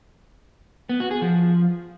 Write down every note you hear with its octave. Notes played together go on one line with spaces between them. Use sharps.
B3
F#4
G#4
F3